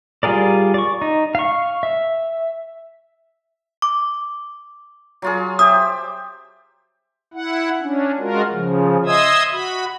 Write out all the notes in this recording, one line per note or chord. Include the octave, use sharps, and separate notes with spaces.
G3 F4 G#4 A#4 D5
D5 C#6
D#4
F5 C#6
E5
D6
F#3 F4 G#4
G4 C5 E5 D#6
E4 F#5
C#4 D4
G#3 F4 F#4 A#4
C#3 F3
D#5 E5 C6 D#6 E6 G#6
F#4 B5